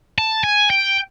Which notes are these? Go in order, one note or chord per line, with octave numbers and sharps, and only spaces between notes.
A5
G#5
G5